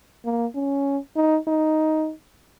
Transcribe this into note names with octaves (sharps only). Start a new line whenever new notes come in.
A#3
C#4
D#4
D#4